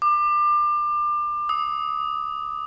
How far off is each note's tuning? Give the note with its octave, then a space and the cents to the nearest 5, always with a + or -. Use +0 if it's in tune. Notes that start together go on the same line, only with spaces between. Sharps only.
D6 +25
D#6 +30